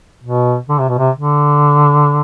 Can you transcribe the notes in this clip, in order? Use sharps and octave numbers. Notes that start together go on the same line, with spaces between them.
B2
D3
C3
B2
C3
D3